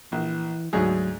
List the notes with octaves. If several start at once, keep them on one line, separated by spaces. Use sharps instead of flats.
A#1 E3
D2 G#2 F#3 G#4